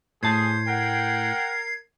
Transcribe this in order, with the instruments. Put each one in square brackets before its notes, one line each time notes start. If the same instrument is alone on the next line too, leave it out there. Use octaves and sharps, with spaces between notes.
[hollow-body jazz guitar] A2 A5 [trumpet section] G#4 [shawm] C5 [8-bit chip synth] G#6 C7
[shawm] A#4 [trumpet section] F#5 G5